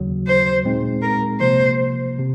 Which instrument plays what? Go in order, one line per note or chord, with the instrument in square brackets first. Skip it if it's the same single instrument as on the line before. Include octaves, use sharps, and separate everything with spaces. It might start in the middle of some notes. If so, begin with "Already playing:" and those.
Already playing: [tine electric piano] D#2 C#3 F#3
[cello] C5
[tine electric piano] A#2 G#3 C4 D#4
[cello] A#4
[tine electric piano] C3 F3 A#3 [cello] C5
[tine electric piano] C3